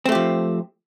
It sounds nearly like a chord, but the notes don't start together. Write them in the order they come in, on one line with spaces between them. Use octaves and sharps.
C4 A3 G4 F3